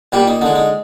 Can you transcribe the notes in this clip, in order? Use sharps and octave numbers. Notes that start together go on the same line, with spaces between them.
A#2 G3 A#3 G4
D#4
D3 G#3 D#4
D#4